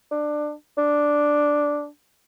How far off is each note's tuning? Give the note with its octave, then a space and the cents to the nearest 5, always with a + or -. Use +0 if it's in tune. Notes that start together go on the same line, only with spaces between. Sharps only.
D4 +20
D4 +0